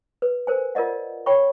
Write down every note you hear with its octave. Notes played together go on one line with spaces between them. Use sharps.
B4
A#4 C5 G#5
F4 A#4 D5 D#5 F#5
C#5 G5 B5 C#6